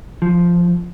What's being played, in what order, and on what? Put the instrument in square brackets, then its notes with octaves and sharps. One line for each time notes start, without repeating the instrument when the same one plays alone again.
[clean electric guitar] F3